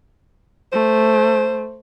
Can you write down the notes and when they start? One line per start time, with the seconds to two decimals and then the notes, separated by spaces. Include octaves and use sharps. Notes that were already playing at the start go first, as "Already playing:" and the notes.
0.73 A3 C5